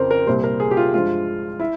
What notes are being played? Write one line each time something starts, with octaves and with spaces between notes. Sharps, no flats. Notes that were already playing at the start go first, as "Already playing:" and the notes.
Already playing: F2 C#3 F3 C4 A#4 C5
A#4
C2 A#2 G3 C5
A#4
G#4
G4
F4
G2 F3 G#3 F4
E4